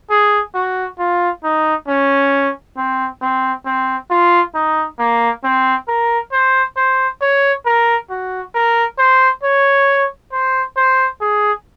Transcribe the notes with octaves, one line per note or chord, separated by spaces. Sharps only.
G#4
F#4
F4
D#4
C#4
C4
C4
C4
F4
D#4
A#3
C4
A#4
C5
C5
C#5
A#4
F#4
A#4
C5
C#5
C5
C5
G#4